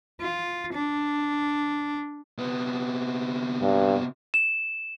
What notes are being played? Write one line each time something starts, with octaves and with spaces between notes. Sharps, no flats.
F4
D4
C3 B3
G2
E7